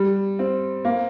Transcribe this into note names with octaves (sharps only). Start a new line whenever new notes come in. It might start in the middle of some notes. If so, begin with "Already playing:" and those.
Already playing: G3
C4
A#3